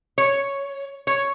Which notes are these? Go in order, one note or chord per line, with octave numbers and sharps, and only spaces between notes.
C#5
C#5